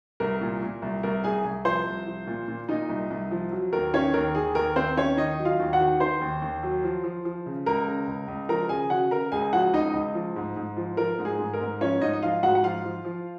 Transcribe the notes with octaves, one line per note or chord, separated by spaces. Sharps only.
C2 A#4
A#2
A#2
C2
C2 A#4
C2 G#4 G#5
C2
F3 C5 C6
C2
F3
A#2
A#2
A#2 D#4 D#5
C2
C2
F3
F#3
D#2 A#4
D#3 C#4 C#5
D#2 A#4
D#3 G#4
D#2 A#4
D#2 C4 C5
D#2 C#4 C#5
D#3 D#4 D#5
F#3
F4 F5
D#2
F#4 F#5
D#3
D#3 C5 C6
D#2
D#2
F#3
F3
F3
F3
C#3
C#2 A#4 A#5
C#3
C#2
C#2
F3 A#4 A#5
C#3 G#4 G#5
C#3 F#4 F#5
C#3 A#4 A#5
C#2 G#4 G#5
F3 F#4 F#5
C#2 D#4 D#5
C#2
F3
G#2
G#2
F3
F3 A#4
G#2
G#4
G#2
A#4
G#2
F3 C#4 C#5
G#2 D#4 D#5
D#5
F3 F4 F5
G#2 F#4 F#5
F#5
F3 F4 F5
F3
F3